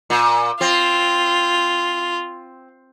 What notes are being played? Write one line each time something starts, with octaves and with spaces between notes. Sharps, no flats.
A#2
C4 F4